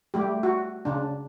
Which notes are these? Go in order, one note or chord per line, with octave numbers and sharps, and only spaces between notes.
G3 A3 G4
F#4
C#3 D4